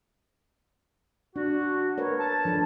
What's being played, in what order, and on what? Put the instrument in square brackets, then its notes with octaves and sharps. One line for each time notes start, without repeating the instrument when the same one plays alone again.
[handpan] D4 [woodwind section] F#4
[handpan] A#4 B4 C#5
[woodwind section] A5
[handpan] F3 D4 A4